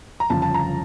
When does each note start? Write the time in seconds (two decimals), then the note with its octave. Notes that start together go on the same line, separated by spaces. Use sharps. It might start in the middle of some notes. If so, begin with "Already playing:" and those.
0.20 A#5
0.30 G1 F2 C#3 A5
0.42 A5
0.54 A#5